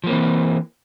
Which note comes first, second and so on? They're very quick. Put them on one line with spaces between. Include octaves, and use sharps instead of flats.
F3 A#3 C4 E3